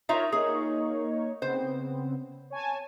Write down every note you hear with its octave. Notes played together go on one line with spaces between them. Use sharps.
D#4 F4 A#4 C#5 E5
A#3 D#4 G#4 C#5
C#3 B3 C4 C5
C#5 G#5 A5